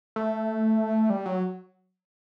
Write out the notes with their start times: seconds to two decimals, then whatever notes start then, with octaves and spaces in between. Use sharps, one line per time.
0.16 A3
1.10 G3
1.26 F#3